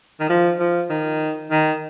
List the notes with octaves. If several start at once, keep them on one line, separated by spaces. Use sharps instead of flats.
D#3
F3
F3
D#3
D#3